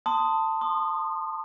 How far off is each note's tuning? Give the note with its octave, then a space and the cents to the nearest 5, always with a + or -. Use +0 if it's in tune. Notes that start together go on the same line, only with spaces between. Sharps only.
A5 +15 C6 -15 D#6 +0
C6 +15 D#6 -25